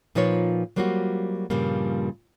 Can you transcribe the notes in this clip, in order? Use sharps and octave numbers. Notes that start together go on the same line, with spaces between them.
A#2 F3 D#4 F4 B4 C#5
F#3 G3 A#3 C4 F4 F#4
G2 A#2 C#3 F3 G3 A#3